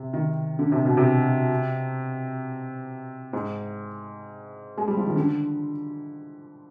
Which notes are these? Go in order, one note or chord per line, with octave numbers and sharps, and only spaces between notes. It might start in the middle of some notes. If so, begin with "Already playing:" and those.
Already playing: C3
D#3
D3
C3
B2
C3
G#2
G#3
G3
F3
D#3
D3